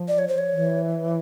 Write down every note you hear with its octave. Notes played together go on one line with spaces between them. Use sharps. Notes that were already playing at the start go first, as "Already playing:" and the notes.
Already playing: F3
D5
C#5
C5
C#5
E3